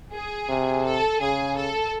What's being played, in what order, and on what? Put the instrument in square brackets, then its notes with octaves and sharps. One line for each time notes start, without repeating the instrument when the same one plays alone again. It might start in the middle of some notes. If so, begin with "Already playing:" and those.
[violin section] G#4
[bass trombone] C3
[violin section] A4
[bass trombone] C#3 [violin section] G#4
[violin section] A4